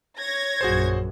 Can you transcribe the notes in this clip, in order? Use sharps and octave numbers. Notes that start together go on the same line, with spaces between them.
C#5 G#6 A#6
A#1 F#2 F#4 G#4 C5